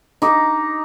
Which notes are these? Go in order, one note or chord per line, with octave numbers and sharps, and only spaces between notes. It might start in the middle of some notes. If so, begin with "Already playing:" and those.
D#4 D6